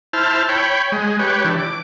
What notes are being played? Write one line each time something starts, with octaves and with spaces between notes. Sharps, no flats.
E4 C5 A5 F6
C#5 G5 B5
G#3
G4 B4 C#5
E3 D4
D6